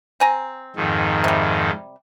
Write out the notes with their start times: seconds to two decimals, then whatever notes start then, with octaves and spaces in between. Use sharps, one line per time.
0.20 C4 G#5 A#5
0.76 F2 G#2 D#3
1.24 C3 G3